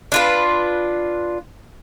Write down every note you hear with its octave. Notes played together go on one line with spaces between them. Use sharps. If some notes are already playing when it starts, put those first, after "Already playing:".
D4 F4 B4